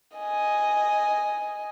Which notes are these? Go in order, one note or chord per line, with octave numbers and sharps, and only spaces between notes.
D#5 G#5